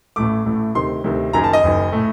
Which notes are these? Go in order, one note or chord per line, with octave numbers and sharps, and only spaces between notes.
A1 A2 A3 D6
A1 A2 A3
D2 C3 D#3 C6
D2 C3 D#3
F#1 F#2 D#3 A#5
A5
D#5
F#1 F#2 D#3
A2 A3